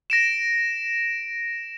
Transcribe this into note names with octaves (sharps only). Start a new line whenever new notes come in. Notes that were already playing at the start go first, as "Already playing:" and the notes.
A#6 D7 E7